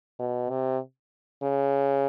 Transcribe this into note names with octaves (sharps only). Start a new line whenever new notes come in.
B2
C3
C#3